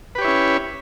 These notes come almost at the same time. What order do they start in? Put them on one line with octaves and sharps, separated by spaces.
B4 G4 C#5 E4 C#4